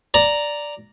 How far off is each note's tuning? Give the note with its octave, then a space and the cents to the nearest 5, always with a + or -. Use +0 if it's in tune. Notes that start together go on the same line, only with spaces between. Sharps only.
D5 +0 A#5 +0